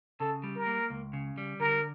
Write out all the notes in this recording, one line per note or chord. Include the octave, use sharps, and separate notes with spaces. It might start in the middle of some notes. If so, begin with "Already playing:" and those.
C#3 A4
G3
A#4
A#3
C#2
C#3
G3
D3 A#4